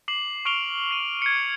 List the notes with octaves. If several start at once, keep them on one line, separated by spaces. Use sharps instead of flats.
D6 C7 F#7
C#6 F6 D7 F7 G7
C7 D#7
G#6 C#7